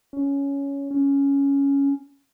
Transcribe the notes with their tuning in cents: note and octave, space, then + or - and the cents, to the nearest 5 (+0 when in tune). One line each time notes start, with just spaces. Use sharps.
C#4 +10
C#4 +5